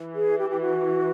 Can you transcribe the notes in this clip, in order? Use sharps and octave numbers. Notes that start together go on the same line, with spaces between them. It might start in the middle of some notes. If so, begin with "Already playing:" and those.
Already playing: E3
G#4
G4
G4
F#4